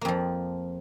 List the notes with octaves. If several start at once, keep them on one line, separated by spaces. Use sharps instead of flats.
F2 F3 A#3